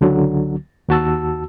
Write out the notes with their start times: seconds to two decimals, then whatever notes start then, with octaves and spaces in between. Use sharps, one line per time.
0.01 C#2 D3 F#3
0.89 D#2 F#4 A5 E6